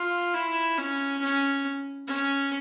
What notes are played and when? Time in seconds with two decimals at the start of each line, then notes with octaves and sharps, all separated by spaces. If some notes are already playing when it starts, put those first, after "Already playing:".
Already playing: F4
0.34 E4
0.78 C#4
1.21 C#4
2.07 C#4